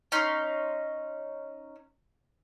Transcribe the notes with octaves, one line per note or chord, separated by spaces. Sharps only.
C#4 D#4 C6